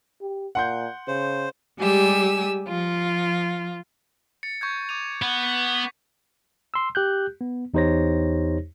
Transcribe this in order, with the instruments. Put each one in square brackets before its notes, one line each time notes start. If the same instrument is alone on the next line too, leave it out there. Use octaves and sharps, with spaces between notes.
[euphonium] G4
[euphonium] A#2 [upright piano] F#5 C6 G6
[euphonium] C#3 [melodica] C5
[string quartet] G3 G#3 G4 G#5 E6
F3 F4
[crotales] A6 C#7
C#6 G6 G#6
D6 D#7 F7
[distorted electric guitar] B3 [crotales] G#6
[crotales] B6
[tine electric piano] C6 E6
G4 F#6 G6
B3
E2 D#4 G4 C5 C#5 A#6